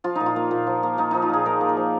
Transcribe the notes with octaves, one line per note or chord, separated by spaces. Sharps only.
F3 F4
A#2 D#4
F4
A#3
A#2
F3
A#3
A#3 D#4
F3 D#4
F4
A#2 G#4
A#3 A#4
A#3
A#4
F3